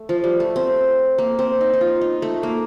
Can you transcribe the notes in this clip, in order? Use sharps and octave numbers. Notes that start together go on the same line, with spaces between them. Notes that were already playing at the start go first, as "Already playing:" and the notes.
Already playing: A3
F3
G3
A3
C4
A#3
C4
D#4
D#4
F4
D#4
A3
A#3